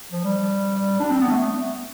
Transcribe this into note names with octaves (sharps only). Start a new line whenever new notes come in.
F3
G3
D4
C4
B3
A3